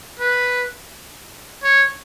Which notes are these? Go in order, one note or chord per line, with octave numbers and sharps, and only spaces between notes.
B4
C#5